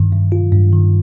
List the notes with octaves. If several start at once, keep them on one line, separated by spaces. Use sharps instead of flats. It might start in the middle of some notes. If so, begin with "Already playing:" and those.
Already playing: G2 D#3
G2
F4
G2
D#3